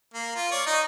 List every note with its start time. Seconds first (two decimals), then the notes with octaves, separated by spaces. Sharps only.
0.14 A#3
0.35 F4
0.51 C#5 D5
0.66 D#4 D#5